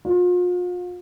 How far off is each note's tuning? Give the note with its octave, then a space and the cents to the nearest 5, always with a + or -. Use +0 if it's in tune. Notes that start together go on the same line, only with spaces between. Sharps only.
F4 +40